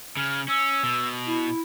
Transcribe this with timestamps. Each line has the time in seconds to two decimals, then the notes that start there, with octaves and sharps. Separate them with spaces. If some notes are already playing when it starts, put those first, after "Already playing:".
0.17 C#3 F6
0.48 C#4 E6
0.83 B2
1.25 E4